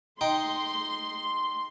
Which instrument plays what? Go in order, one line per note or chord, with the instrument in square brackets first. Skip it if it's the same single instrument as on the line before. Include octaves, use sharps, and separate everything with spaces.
[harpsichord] D#4 G5 [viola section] C6